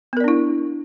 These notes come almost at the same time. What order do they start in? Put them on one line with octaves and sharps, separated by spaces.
B3 A#4 D5 D4 E4